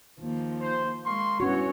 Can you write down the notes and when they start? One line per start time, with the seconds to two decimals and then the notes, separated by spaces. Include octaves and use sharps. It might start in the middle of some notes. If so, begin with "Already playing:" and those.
0.20 D#2 F3
0.61 C5
1.05 G#3 A#3 C6 C#6
1.40 E2 G2 E3 C#4 F#4 C#5